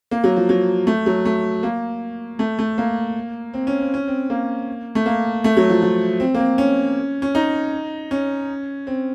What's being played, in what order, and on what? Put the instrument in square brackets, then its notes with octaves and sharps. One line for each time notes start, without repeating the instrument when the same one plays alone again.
[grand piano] A#3
F#3
F3
F#3
A3
F#3
A3
A#3
A3
A3
A#3
C4
C#4
C4
C#4
C4
A#3
A3
A#3
A3
F#3
F3
F3
C4
A#3
C4
C#4
C#4
D#4
C#4
C4